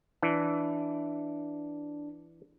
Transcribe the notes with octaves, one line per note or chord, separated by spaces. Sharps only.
E3 D4